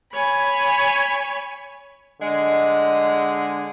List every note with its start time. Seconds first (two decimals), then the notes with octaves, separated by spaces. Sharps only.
0.14 C#5 G#5 B5
2.21 D3 G#3